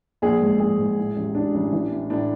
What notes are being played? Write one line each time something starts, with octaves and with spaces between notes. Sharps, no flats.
A#1 G#4
G#2
A#1 G#4
G#2
A2
A1
A1 D4
A1
E3
A2
A2 D4